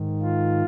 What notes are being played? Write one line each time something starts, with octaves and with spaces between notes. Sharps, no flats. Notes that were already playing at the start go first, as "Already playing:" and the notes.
Already playing: G#2 D#3
F4